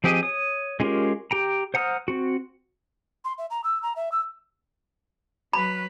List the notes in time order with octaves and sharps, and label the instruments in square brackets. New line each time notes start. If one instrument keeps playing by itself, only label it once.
[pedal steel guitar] F3 C4 G4 G#4 D#5
C#5 D#6
G#3 C#4 F4 G4 A#4
G4 G5 A#5
C5 F#5 A#5 D#6 F6
C4 F#4
[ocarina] C6
E5
A#5
E6
A#5
E5
E6
[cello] F#3 B4 [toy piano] B5